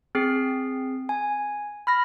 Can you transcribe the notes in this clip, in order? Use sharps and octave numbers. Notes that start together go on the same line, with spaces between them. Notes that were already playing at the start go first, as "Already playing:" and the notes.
C4 G#4 C7
G#5
B5 F6 A#6